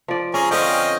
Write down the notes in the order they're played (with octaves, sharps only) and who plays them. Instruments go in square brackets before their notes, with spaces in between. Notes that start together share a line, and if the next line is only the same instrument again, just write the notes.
[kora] F3 D5
[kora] C#4 [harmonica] G#4 G#5 A#5
[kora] D3 C4 C#4 [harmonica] D#5 F5 G5